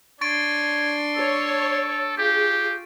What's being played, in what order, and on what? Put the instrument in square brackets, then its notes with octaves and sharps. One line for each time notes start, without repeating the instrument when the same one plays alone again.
[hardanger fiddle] D4 C6 [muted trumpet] C#5 [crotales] C#6 A6 D7
[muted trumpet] A4 [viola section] C#5
[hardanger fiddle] F4 [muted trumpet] G4 [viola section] G#4